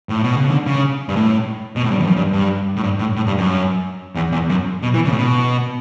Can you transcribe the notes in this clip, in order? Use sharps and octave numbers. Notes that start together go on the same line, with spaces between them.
A2
B2
C#3
D3
C#3
G2
A2
B2
A2
G2
E2
F#2
G2
G2
A2
G2
A2
A2
G2
F#2
E2
E2
F#2
B2
E3
C#3
A2
B2